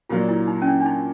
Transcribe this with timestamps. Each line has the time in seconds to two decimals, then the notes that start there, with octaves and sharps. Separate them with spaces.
0.09 A#2 F#3 A#3 D4 F4
0.29 E4
0.48 D#4
0.62 C#4
0.67 D4
0.81 D4
0.86 D#4